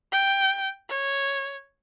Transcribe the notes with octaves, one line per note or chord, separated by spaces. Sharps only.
G5
C#5